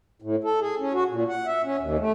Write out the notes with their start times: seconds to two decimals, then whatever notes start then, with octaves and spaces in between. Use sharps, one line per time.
0.22 A2
0.44 A4
0.61 G#4
0.79 C#4
0.93 F#4
1.10 A#2
1.29 F#5
1.46 E5
1.64 C#4
1.80 D#2
1.98 A3